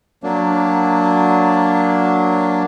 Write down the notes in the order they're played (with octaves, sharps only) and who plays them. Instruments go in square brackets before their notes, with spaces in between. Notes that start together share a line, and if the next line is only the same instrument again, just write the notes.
[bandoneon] F#3 A#3 D4